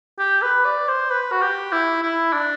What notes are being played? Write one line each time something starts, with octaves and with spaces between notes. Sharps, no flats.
G4
B4
D5
C5
B4
F#4
G4
E4
E4
D4